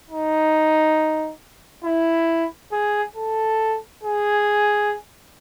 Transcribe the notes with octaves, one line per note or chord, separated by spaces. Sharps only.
D#4
E4
G#4
A4
G#4